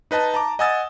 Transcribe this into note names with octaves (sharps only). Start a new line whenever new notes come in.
D#4 B4 D#5 A5
A5 A#5 D6
D#5 F#5 G#5 D#6 E6 A6